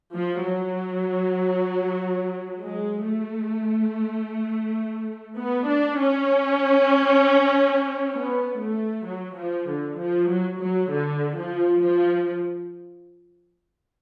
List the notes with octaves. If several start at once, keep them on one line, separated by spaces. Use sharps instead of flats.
F3
F#3
G#3
A3
B3
D4
C#4
B3
A3
F#3
F3
D3
F3
F#3
F#3
D3
F3
F3